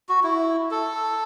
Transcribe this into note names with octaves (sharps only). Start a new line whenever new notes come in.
F#4
E4
A4